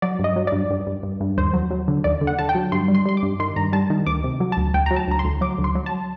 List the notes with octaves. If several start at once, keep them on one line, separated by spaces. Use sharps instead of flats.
F#3 D5
G2
D#5
F#3
G2 D5
G2
G2
G2
G2
D#2 C5
F#3
F#3
D3
D#2 D5
D3
F#5
D3 A5
G5
F#3
G2 C6
G3
C6
G3 C6
D6
G2
D#3 C6
G2 A#5
G3 A5
D#3
D2 D6
C3
F#3
A5
D2
D2 G5
F#3 A#5
A5
D2 A#5
C6
D2
F#3 D6
D2
C6
F#3
A5